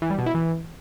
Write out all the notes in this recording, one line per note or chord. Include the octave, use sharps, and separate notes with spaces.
E3
G3
B2
E4
E3